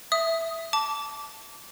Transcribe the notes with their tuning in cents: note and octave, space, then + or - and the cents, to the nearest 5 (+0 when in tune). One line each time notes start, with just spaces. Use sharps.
E5 +0 D#6 +5
A5 +0 D6 -20